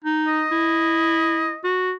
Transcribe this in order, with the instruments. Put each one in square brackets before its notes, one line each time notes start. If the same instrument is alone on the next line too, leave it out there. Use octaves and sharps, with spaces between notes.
[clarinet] D#4
[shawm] D#5
[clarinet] E4
F#4